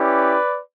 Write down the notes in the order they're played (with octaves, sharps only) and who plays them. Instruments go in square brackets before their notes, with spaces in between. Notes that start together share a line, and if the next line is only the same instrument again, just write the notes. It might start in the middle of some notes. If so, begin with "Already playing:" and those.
Already playing: [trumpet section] C#4 E4 G4 B4 D5